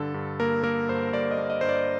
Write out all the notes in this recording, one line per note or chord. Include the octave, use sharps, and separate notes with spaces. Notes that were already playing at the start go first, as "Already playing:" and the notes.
Already playing: G2 D3 A4
G2
A#3 A#4
A#3 A#4
G2 C5
G2 D5
D#5
A#3
D#5
G2 C5
D5